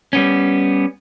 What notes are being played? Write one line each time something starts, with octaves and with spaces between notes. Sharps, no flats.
G3 B3 C#4